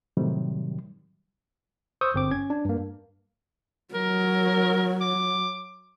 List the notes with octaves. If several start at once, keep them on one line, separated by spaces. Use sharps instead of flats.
A2 C3 D#3 F#3 G3
C5 C#6 D#6 E6 G6
G1 C4 D6
C#4 G#6
D4
G2 A#3
F#3 A#4
D6